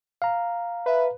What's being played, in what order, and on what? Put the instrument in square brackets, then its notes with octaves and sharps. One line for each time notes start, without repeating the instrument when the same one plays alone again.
[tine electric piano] F5 A#5
[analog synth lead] B4 [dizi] E5